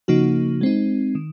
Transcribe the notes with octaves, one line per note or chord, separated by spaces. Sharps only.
C#3 F3 A#3 D#4 F#4
G#3 C4 D#4
D#3